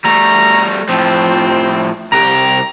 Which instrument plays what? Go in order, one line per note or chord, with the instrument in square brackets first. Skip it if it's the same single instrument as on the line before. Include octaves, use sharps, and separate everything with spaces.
[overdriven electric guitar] G3 A3 [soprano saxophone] A#5
[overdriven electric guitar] A2 F3 [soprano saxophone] C4
[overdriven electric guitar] C2 G4 [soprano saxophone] A#5